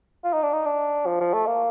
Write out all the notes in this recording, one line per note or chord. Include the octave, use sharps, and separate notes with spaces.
F4
D#4
D4
D#4
D4
F3
F3
A3
A#3